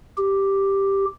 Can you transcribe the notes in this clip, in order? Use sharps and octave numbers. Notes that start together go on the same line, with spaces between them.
G4